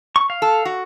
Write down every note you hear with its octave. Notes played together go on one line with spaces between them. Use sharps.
C#6
F5
A4
F#4